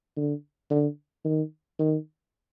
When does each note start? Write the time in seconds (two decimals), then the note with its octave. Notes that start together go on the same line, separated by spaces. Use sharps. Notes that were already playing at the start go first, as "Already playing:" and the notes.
0.17 D3
0.70 D3
1.25 D#3
1.79 D#3